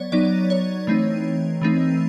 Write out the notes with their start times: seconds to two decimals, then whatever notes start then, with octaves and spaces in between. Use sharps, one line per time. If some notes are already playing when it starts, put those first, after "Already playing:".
Already playing: F#3 B3 C#5 D5
0.12 F#3 B3 D#4 D5
0.50 C#5
0.87 E3 A3 C4 D#4
1.61 E3 A3 C4 D#4